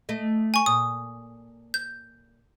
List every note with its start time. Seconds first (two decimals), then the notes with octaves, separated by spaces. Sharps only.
0.09 A3 D#5
0.54 G#5 C#6
0.66 A#2 D#6
1.74 G6